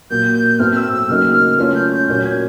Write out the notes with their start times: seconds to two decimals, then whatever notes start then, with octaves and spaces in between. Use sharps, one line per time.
0.10 A#2 F#3 A#3 G6
0.34 G6
0.59 A2 F#3 A3 C4 F6
0.72 F6
0.76 E6
0.93 E6
1.09 C#3 F#3 A#3 D#4 F6
1.34 F6
1.58 A3 C#4 F4 F6
1.75 G6
1.92 G6
2.08 A#2 F#3 A#3 C#4 G6
2.25 G#6